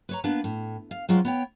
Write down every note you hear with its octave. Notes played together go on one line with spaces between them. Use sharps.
B4 C#5 A#5
A#3 B3 D4 B4
A2
F5
F#3 G#3 C4 C#4 F4 F#5
B3 C#5 G5